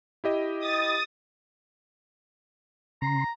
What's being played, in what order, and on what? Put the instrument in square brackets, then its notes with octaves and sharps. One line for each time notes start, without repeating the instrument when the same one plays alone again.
[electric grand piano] E4 G4 D#5
[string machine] D#6 A6
[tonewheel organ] C#3 C6 [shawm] A#5